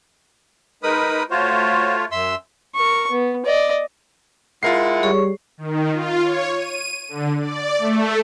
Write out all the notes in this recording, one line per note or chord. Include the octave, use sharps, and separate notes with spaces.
G#3 D#4 A#4 B4 B5 D#6
A3 F4 F#4 C5 C#5
F#2 E5 C6 E6
A#4 C#6
B3
D5 D#5
G#3 E4 F4 A#4 F#5 C7
G3 G#4 C#5 C#6
D#3
F4
C#5
D#7
D3
D5
A3